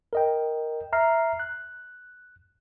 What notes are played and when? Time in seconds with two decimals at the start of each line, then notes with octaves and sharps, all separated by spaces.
0.13 A#4 D#5 G5
0.93 E5 A#5 F6 C7
1.40 F#6